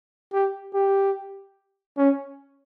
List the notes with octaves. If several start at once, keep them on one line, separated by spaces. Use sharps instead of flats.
G4
G4
C#4